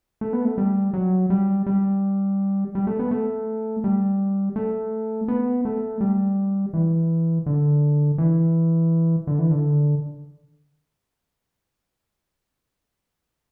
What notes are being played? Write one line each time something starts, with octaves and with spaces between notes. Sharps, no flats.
A3
B3
A3
G3
F#3
G3
G3
G3
A3
B3
A3
G3
A3
B3
A3
G3
E3
D3
E3
D3
E3
D3